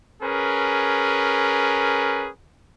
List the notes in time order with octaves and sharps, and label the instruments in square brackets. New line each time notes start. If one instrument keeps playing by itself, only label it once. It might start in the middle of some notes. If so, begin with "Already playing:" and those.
[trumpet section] C#4 G#4 A#4 B4